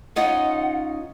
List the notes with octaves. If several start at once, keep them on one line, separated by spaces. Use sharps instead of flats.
C#4 D#4 F4 F#5